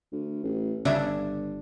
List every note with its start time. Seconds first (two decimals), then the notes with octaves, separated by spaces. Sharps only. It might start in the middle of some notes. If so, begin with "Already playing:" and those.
0.12 D2
0.43 A1
0.85 G1 C#3 D4 E5 G#6